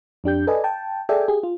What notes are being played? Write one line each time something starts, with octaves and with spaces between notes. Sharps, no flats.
F2 D4 G4 G6
A4 B4 D5 D#5 G#5
G5 A5
G#4 A4 D5 E5 G5 G#5
G4 G#4
F4